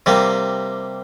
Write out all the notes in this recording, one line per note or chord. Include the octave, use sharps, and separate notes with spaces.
C3 G3 A#3